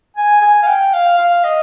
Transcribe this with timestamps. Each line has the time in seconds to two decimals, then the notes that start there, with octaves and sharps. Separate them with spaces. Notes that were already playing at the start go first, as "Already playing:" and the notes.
0.17 G#5
0.41 G#5
0.63 F5
0.67 G5
0.94 F5
1.18 F5
1.44 D#5